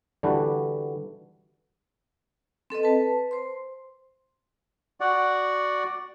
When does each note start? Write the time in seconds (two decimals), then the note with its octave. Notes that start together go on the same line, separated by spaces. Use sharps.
0.23 D3 E3 G3 D4 F#4 B4
2.70 C4 A4 B4 D#5
2.83 B4 A5
3.31 C5 C6
5.00 F#4 D5 F#5